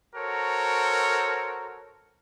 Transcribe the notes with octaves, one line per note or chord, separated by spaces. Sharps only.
F#4 A4 A#4 C5 C#5